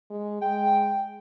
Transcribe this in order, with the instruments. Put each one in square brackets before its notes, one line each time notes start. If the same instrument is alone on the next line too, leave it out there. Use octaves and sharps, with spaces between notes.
[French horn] G#3
[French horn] G#3 [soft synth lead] G5